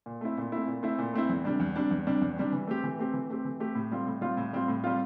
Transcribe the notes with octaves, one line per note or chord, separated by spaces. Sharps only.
A#2
A3 C4 E4
A#2
A3 C4 E4
A#2
A3 C4 E4
A#2
A3 C4 E4
E2
C3 G3 D4
E2
C3 G3 D4
E2
C3 G3 D4
E2
C3 G3 D4
E3
A3 C4 G4
E3
A3 C4 G4
E3
A3 C4 G4
E3
A3 C4 G4
A2
G3 C4 F4
A2
G3 C4 F4
A2
G3 C4 F4
A2
G3 C4 F4